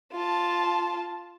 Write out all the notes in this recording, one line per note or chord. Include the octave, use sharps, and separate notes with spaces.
F4 A5